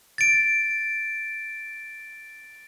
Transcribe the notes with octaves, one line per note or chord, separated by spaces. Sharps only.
A6 D7